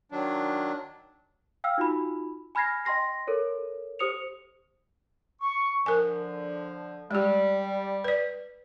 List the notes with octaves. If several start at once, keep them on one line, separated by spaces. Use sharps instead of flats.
D#3 F#3 D4
F5 G5 E6 F6
D#4 F4 F#4 B5
G#5 B5 F6 G#6 A#6 C7
D#5 G5 C6 A#6 C7
A4 A#4 C#5
G4 C5 D#6 C#7 F7
C#6
D3 F3 A#4 G#5
G3 G#3 G4
B4 D5